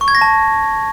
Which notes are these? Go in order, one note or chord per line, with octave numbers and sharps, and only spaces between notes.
C#6
G#6
A#6
A5